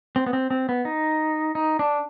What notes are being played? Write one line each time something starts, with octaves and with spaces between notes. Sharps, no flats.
C4
B3
C4
C4
B3
D#4
D#4
D4